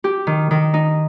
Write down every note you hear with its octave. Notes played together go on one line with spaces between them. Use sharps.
G4
D#3
D#3
D#4